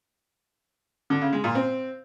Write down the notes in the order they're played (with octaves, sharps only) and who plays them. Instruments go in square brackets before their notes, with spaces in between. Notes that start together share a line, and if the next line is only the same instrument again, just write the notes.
[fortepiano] D3
C#3
G#3
A#2
C4